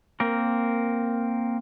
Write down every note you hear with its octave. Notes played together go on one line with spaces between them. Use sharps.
A#3 C4 A#4